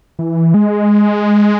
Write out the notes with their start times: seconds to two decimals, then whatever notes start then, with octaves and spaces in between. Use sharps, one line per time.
0.19 E3
0.54 G#3